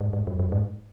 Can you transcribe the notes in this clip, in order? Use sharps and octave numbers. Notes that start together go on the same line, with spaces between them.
G#2
G#2
F#2
F#2
G#2